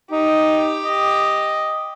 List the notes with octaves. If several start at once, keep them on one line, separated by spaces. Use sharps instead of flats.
D#4 G4
D#5